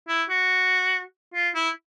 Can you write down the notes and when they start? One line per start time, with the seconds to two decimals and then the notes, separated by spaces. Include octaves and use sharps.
0.09 E4
0.29 F#4
1.34 F4
1.55 E4